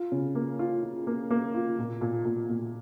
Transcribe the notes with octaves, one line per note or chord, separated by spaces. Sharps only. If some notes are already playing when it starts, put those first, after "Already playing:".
Already playing: F4
C#3
A#3
F4
F4
A#3
A#3
F4
A#2
A#2
A#2
A#2